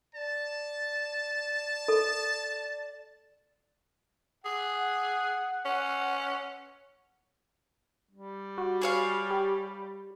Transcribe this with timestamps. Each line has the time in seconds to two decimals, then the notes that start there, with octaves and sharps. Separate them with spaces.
0.15 D5 A5
1.88 A4
4.45 G#4 F#5
5.65 C#4
8.11 G3
8.58 F#4
8.82 G#4 C#5 F5
9.31 G4